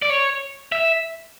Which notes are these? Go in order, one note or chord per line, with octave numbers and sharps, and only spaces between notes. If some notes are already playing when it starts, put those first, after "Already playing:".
D5
C#5
E5